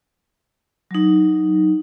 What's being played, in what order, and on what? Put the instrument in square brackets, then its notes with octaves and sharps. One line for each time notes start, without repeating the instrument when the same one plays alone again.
[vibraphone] F#3 D#4